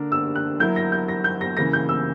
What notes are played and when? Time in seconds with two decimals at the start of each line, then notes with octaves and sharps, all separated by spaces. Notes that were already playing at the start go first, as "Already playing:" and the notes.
Already playing: D3 A#3 D4 A#4
0.12 E6
0.35 F#6
0.60 F#3 A#3 E4 A#4 G6
0.76 A#6
0.92 G6
1.08 A#6
1.24 G6
1.41 A#6
1.57 C#3 E3 A#3 A#6
1.73 G6
1.89 E6